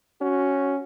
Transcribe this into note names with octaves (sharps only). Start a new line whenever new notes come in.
C#4 F#4